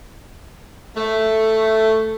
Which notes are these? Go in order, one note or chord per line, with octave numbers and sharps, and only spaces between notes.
A3